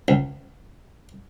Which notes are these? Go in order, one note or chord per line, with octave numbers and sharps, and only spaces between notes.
C#2